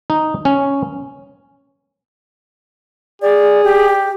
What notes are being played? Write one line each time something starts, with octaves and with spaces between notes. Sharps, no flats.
D#4
C#4
G#4 D5
G4